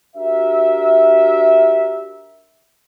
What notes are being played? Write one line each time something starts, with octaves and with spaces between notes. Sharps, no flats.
D4 F#4 G4 A#4 E5